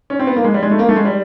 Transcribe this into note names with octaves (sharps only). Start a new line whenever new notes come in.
C#4
C4
B3
A#3
G#3
G3
G#3
A3
A#3
A3
G#3
G3